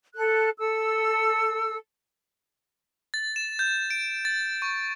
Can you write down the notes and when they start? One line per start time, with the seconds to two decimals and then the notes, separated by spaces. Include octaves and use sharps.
0.14 A4 F#6
0.58 A4 E6
3.14 A6
3.36 E7
3.59 G6
3.90 D7
4.25 A6
4.62 C#6